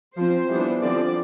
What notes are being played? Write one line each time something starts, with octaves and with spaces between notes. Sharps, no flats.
F3 C4 C5
E3 G3 B3 D4
D3 F3 C4 D5